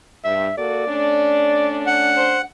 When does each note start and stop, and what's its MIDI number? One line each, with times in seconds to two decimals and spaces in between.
0.25 0.48 43
0.25 0.56 76
0.57 0.85 58
0.57 0.85 66
0.57 0.85 69
0.57 2.08 74
0.87 2.44 57
0.87 2.44 61
0.87 2.44 62
1.87 2.42 78
2.17 2.38 72